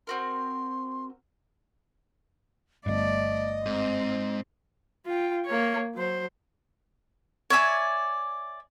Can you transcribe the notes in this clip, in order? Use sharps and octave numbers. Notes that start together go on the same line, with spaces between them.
C4 F#4 A#4 C6
G1 G2 A3 D5 D#5
G#2 C4
F4 G5
A#3 C#5
F#3 C5
C#5 D5 E5 G#5